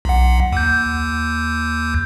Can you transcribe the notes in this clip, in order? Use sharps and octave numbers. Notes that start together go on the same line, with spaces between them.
B1 F#5
D#2 G6